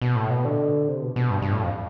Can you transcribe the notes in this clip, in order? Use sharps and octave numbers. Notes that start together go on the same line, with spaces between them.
B2
A2
B2
D3
C3
B2
B2
G2
G2
A2
F2